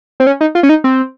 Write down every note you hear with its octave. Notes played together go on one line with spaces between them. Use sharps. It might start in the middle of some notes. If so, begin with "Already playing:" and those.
C4
C#4
D#4
F4
C#4
D#4
C4